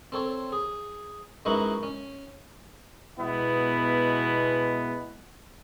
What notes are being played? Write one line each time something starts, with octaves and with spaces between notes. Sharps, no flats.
C4 A4 C#5
G#4
F#2 G#3 D#4 E4 B4 C#6
C#4
B2 G#3 B3 E4